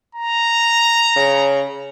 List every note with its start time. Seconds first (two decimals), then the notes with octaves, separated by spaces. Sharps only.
0.15 A#5
1.16 C#3